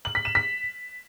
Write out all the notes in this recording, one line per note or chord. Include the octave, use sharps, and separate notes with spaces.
F#7
B6
E7
B6